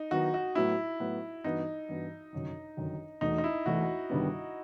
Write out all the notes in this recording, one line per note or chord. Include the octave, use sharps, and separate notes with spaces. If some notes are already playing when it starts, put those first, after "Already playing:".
Already playing: D#4
D#3 F#3 B3 E4 F#4
F#4
A2 F#3 B3 E4 F#4
A2 F#3 B3 F#4
G2 E3 B3 D#4 F#4
G2 E3 B3 F#4
G1 F#2 D#3
G1 F#2 D#3
E1 E2 B2 A3 D#4
D#4
E4
E1 E2 B2 A3 F#4
G1 G2 D#3 G3 B3